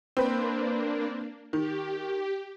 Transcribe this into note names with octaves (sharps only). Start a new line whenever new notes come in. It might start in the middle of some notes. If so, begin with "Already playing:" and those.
A#3 C4 D4 B4
D#3 G4